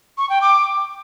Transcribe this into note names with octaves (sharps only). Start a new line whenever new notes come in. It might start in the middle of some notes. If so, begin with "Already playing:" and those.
C#6
G5
D6